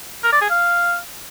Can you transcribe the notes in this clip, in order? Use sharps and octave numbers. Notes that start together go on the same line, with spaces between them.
A#4
D5
G#4
F5